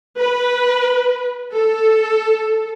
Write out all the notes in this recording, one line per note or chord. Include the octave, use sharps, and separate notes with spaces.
B4
A4